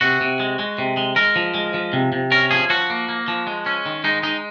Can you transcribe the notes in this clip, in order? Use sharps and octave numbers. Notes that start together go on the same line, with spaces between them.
C3 F#4
C3
G#3
G#3
C3
G#3
G#3 A#4
F3
G#3
F3
C3
C3
C#4 A#4
F3 G#4
F3 F#4
A#3
A#3
F3
G#3
C#4
D#3
G#3 D#4
G#3 D#4